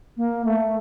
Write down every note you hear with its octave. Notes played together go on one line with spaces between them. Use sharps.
A#3
A3